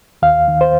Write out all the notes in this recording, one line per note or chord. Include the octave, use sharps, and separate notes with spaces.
D#2 F5
D#3
C5